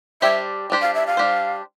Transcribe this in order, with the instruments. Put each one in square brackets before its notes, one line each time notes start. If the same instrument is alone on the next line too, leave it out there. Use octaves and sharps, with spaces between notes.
[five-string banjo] G3 D4 G4 C5 [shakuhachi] E5
[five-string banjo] G3 D4 G4 C5
[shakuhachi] F5
E5
F5
[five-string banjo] G3 D4 G4 C5